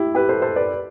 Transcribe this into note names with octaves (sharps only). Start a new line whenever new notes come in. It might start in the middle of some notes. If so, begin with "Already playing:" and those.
Already playing: E4 G4
G4 B4
A4 C5
A4 C5
B4 D5